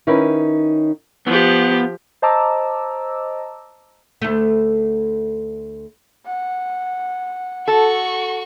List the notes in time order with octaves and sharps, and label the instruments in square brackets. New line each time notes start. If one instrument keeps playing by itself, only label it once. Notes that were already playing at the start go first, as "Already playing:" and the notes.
[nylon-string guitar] D#3 C#4 D#4 E4 A#4 B4
[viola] F3 G4 [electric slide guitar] B3
[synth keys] C5 D#5 A5 A#5 D6 E6
[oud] D2 A3
[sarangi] F#5
[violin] F#4 C#6 [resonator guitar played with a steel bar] A4